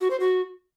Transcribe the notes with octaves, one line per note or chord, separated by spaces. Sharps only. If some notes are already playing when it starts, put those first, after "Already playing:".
F#4
C5
F#4